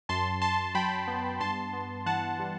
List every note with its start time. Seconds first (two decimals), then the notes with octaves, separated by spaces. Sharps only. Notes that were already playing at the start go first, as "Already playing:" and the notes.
0.09 F#2 A5 C6
0.42 F#2 A5 C6
0.75 F#3 G5 B5
1.08 B3
1.40 G2 A5 C6
1.73 B3
2.06 E3 F#5 A5
2.39 G3